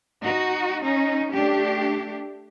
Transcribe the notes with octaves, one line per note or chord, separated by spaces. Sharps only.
D#4 F#4
C#4 D#4
A3 D4 G4